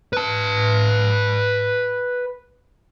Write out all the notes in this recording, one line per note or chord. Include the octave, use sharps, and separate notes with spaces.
B4 A5